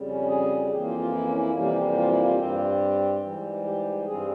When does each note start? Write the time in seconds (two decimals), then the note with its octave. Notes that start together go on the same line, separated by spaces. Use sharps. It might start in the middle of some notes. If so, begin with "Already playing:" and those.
Already playing: F2 C#3 G3
0.08 C#4
0.28 G#4
0.71 F2 E3 A#3 G4
0.85 F4
0.99 F4
1.12 E4
1.26 C#4
1.39 E4
1.54 F2 C3 E3 G3 A#3 C#4
1.65 E4
1.75 G4
1.90 G4
1.97 F4
2.11 E4
2.24 F4
2.38 G2 G3 C4 G4
3.22 G#2 E3 G3
3.64 G4
4.06 G2 G3 C4 G#4